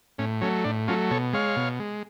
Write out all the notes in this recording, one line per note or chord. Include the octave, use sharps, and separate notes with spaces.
A2 C#4
F#3 A3 C#4
A2 D4
F#3 A3 C#4 F4
B2 A4 C#5
G#3 C#5 F5
B2
G#3